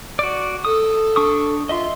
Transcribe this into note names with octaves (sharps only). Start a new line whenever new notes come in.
F#4 D5
A4 D#6
D4 C#6 D#6
F4 D#5 E5 C6